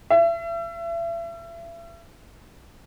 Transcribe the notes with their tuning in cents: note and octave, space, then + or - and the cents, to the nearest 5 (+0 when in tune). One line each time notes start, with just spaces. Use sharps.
E5 +35